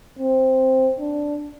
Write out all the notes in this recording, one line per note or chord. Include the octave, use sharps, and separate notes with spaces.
C4
D4